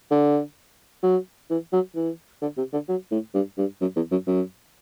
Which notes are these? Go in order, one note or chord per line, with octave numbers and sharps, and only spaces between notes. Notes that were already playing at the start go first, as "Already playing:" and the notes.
D3
F#3
E3
F#3
E3
D3
C3
D3
F#3
A2
G2
G2
F#2
E2
F#2
F#2